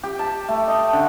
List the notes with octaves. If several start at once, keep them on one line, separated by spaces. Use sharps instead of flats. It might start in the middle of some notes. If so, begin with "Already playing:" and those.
G4
A5
A3
D#5
D3